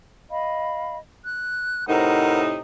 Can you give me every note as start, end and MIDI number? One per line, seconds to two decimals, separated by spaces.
0.30 0.97 75
0.30 0.97 77
0.30 0.97 83
1.23 1.87 90
1.88 2.60 45
1.88 2.60 48
1.88 2.60 63
1.88 2.41 70
1.88 2.41 72
1.88 2.41 78